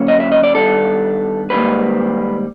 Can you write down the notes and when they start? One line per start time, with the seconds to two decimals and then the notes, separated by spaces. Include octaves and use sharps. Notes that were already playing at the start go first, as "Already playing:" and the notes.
Already playing: D3 F#3 A#3 C#4
0.08 D#5
0.20 E5
0.32 D#5
0.43 D5
0.55 G2 D#3 G3 B3 D4 A4
1.50 G#2 D#3 G3 A#3 B4